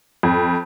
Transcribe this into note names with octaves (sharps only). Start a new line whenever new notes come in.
F2